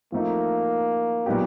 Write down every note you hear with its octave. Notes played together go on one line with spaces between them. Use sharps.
F3 A3 A#3 C4 D#4
A#2 F#3 B3 D#4 G4